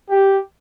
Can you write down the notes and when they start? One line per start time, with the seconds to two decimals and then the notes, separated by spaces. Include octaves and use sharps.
0.10 G4